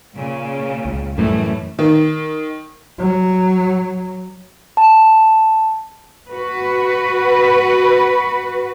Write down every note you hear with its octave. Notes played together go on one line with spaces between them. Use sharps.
A#2 C#3
C#2
F#2 A2 E3 G3 A3
D#3
F#3
A5
F#4 B4